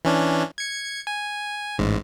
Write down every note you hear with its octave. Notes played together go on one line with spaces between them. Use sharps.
E3 C#4 D4
G#6 C#7
G#5
A1 G#2